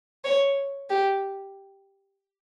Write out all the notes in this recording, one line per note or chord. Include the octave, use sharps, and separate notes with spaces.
C#5
G4